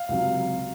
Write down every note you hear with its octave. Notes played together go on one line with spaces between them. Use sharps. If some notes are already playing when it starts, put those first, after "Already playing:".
Already playing: F5
C#2 C3 F#3